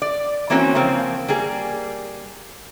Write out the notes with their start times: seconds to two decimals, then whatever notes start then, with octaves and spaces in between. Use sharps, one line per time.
0.02 D5
0.50 E3 A#3 C4 C#4 F#4 C#5
0.75 C#3 F3 A#3 C4
1.28 G3 A#3 G#4